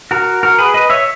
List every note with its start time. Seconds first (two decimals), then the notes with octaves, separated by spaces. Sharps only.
0.11 F#4 A#4
0.43 F#4 A#4
0.59 G#4 B4
0.74 B4 D#5
0.90 C#5 E5